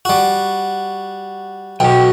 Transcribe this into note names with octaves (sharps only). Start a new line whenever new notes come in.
G3 F#4
B1 B2 F#4 G5